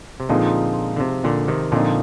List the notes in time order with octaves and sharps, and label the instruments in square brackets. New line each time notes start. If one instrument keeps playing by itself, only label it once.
[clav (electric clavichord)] C3
[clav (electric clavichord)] A#2 D3 [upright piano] F3 G#3 C4 D#4
[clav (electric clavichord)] D3
C3
A#2 D3
C3 D#3
[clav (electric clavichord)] A#2 D3 [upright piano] F3 C4 D#4